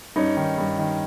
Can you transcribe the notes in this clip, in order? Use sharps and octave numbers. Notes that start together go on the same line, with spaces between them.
G2 C#4 D#4
D#3
G2
D#3